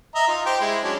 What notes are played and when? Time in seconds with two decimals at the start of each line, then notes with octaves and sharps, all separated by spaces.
0.15 D#5 E5 A#5
0.27 D#4 F4
0.46 G4 C5 G5
0.60 G#3 E4
0.84 F#3 C#4 D4